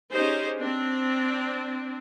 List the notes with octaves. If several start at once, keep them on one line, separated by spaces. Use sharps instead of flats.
C#4 D#4 G4 G#4 C5
C4 D4